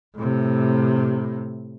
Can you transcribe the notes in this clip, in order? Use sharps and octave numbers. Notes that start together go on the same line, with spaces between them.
A2 C3